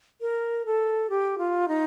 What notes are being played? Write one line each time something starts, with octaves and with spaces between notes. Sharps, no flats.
A#4
A4
G4
F4
D#4